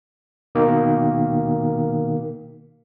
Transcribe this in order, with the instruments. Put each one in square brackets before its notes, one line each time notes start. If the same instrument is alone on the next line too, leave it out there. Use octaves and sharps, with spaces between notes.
[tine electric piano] B2 D#3 A#3